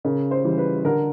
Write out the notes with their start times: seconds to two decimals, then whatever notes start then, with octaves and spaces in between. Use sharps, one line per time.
0.05 C#3 A#4
0.31 C5
0.44 E3 G3
0.58 B4
0.85 D3 A#4